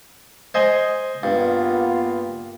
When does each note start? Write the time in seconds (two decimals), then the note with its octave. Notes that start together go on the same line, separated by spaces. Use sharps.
0.54 C5 D#5 G#5
1.23 G2 A#3 B3 F4